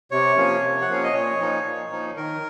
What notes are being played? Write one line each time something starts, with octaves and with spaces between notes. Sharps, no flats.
C3 C#5
F3 A#3 C#4
C3
F#5
F3 A#3 C#4 F5
D#5
A#2 C#5
F3 A#3 D#4
A#2
F3 A#3 D#4
D#3 A#4